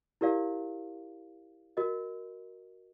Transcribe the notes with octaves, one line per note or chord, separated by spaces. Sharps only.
E4 G4 A#4 D5 F5
F#4 A#4 D#5